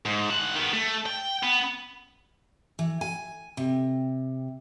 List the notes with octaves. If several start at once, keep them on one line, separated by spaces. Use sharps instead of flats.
G#2
G2 F#5
D#3 B3
A3
G5
B3
E3
G#5
C3